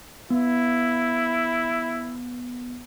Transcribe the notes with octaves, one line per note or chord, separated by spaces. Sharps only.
B3 E4